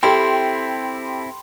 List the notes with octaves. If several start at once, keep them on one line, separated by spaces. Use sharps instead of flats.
C4 E4 G4 A4 G5 A5 B5 C6